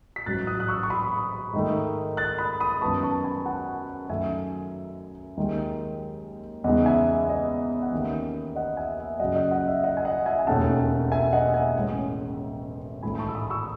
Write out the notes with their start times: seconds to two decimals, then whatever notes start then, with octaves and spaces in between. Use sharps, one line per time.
0.16 B6
0.26 A1 G#2 F#3 F#6 A6
0.47 D#6 F#6
0.60 F#6
0.68 C#6 E6
0.83 C#6
0.90 B5 D#6
1.53 G#2 D#3 A3
2.17 F#6 A6
2.38 B5 D#6
2.60 B5 D#6
2.81 F#2 D#3 G#3 B3 A5 C#6
3.03 A5 C#6
3.24 G#5 B5
3.45 F#5 A5
4.09 F#2 D#3 F#3 A3 E5 G#5
5.37 D#2 D#3 G#3
6.64 E2 C#3 G#3 D#4 D#5 F#5
6.86 E5 G#5
7.07 E5
7.29 D#5
7.82 F#5
7.92 D#2 D#3 A3 C#4 E5
8.56 D#5 F#5
8.77 E5 G#5
8.99 E5
9.20 F#2 C#3 F#3 D#5 F#5
9.35 D#5 F#5
9.51 D#5 F#5
9.68 E5
9.84 D#5 F#5
9.97 G#5
10.05 D#5 F#5
10.26 E5 G#5
10.39 G#5
10.47 E1 D#2 D#3 A3 C#4 F#5 A5
11.11 E5 G#5
11.33 D#5 F#5
11.54 E5 G#5
11.75 A1 A2 G#3 C#4
13.03 A1 G#2 D#3 A3 G#5 B5
13.15 B5
13.18 A5 C#6
13.29 E6
13.35 B5 D#6
13.50 C#6 E6